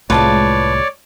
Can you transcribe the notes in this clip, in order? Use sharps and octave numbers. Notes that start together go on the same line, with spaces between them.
C2 A2 G#3 F4 B4 C#5 D5 A5